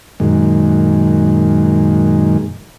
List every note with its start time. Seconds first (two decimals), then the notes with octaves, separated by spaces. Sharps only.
0.20 F#2 A#2 D#3 G#3